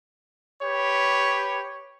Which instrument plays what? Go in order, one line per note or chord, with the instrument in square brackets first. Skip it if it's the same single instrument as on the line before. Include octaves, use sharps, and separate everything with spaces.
[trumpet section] G4 B4 C#5